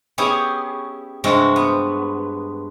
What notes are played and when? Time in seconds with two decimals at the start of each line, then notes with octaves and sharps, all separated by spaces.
0.18 B3 C#4 E4 G4 G#4
1.24 G2 C3 G#3 C4 F4 F#4
1.56 B3